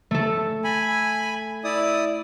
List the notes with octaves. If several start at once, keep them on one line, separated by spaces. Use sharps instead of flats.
A3 A4
G#5 B5
E4 D5 D#6